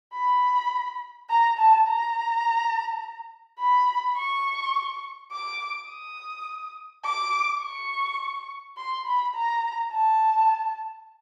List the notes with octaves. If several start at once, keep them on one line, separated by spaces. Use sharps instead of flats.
B5
A#5
A5
A#5
B5
C#6
D6
D#6
D6
C#6
C6
B5
A#5
A5